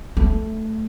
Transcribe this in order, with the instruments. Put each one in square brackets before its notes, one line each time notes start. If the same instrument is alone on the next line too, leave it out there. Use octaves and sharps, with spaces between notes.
[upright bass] A3